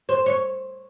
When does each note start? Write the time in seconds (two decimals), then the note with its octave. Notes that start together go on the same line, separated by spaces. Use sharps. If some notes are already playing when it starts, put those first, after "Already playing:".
0.09 C5
0.26 C#5